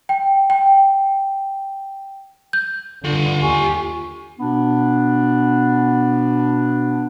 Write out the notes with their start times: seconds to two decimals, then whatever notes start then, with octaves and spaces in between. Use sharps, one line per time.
0.09 G5
0.50 G5
2.53 G6
3.04 G2 D3 F4 F#5
3.42 D#2 G4 G#5 C#6
4.39 B2 B3 D4